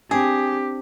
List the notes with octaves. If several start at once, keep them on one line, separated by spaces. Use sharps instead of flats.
C4 D4 G4 G#4